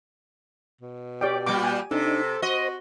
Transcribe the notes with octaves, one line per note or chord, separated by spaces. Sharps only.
B2
G4 C#5 D5 G5 D6
A#2 G3 G5 D6
G4 G#5
C3 D4 D#4 A4
F#4 C5 D#5